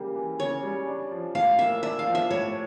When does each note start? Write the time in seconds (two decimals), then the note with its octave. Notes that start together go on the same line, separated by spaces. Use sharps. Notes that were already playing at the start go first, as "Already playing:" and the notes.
Already playing: C#3 E3 G3 A#3 G4
0.16 E3
0.40 C#3 C#5
0.63 G3
0.87 D4
1.11 F3
1.35 A2 F5
1.59 A#3 E5
1.83 D4 E5
1.99 F5
2.06 F3
2.15 E5
2.30 A2 C#5